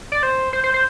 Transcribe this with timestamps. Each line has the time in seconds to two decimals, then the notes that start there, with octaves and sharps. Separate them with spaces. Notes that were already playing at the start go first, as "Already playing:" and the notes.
0.12 D5
0.23 C5
0.53 C5
0.64 C5
0.74 C5